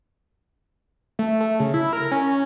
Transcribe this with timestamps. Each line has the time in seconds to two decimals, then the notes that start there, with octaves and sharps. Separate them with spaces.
1.19 A3
1.40 A3
1.60 C#3
1.74 E4
1.93 A#4
2.12 C#4